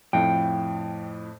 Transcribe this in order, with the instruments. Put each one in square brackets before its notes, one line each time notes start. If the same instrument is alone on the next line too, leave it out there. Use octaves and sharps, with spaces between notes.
[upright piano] F2 A2 [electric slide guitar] F5 G5